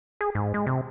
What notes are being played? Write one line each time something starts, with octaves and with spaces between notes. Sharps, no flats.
G#4
G#2
G#3
C3